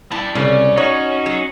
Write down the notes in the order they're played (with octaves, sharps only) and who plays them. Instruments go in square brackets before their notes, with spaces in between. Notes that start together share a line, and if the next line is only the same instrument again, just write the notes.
[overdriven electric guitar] G3 A5 [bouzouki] E4
[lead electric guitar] C2 [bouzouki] C#3 D5 [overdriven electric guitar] C#4
[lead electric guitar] D#4 F#4 [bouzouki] C#5
[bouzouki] F#3